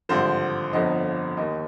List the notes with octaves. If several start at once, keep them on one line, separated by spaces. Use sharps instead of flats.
G#1 G2 D3 F3 C5
G1 F2 D3 F3 D#5
D#2 D#3 D#5